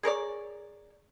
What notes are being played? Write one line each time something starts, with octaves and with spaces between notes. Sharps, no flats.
G#4 A#4 C#5 D5